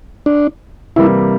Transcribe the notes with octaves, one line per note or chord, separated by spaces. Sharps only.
D4
C3 E3 G3 A#3 E4